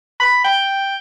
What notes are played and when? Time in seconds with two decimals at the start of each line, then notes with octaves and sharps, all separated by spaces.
0.20 B5
0.44 G5